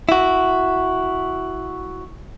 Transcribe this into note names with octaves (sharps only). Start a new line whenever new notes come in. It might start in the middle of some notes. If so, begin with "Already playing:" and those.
E4 F#4